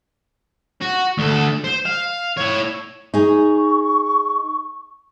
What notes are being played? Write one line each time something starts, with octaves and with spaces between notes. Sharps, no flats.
F#4
D2 A4
C5
F5
E4 C#5
D#4 G#4 C#6